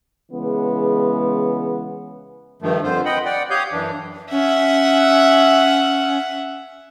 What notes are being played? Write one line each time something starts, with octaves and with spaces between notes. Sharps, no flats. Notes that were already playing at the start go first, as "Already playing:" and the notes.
C#3 E3 G#3 B3
G2 D#3 F3 A3
F2 D3 F4 C5
D#5 F#5 G5 B5
D5 F#5 G5
G4 C#5 F5 D#6 G6
F#2 E3 D4
C#4 E5 F#5